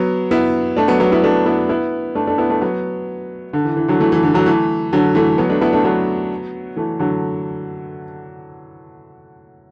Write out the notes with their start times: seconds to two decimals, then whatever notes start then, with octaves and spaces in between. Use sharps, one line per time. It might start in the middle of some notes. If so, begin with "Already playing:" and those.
Already playing: F#3 B3
0.31 B3 E4
0.77 A3 D4
0.88 F#3 B3
1.00 F#3 B3
1.12 B3 E4
1.23 A3 D4
1.46 B3 E4
1.69 B3 E4
2.15 A3 D4
2.27 A3 D4
2.38 B3 E4
2.50 A3 D4
2.62 F#3 B3
3.53 D3
3.65 E3
3.77 E3
3.88 D3 F#3
4.00 E3 A3
4.12 E3
4.23 D3
4.34 D3 F#3
4.46 E3 A3
4.93 D3 F#3
5.15 E3 A3
5.38 F#3 B3
5.50 A3 D4
5.61 B3 E4
5.73 A3 D4
5.85 F#3 B3
6.77 E3 A3
6.99 D3 F#3